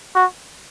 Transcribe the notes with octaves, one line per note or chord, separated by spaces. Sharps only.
F#4